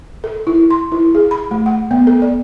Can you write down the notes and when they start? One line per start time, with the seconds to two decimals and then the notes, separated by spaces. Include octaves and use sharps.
0.24 A4
0.47 E4
0.70 C6
0.92 E4
1.15 G#4
1.31 B5
1.51 A3
1.66 F#5
1.91 B3
2.07 A4
2.22 D5